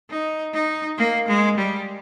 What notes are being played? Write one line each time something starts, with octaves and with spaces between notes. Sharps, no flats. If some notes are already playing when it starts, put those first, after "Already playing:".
D#4
D#4
A#3
G#3
G3